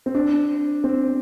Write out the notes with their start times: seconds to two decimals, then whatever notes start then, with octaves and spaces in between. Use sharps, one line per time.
0.06 C4
0.15 D4
0.84 C4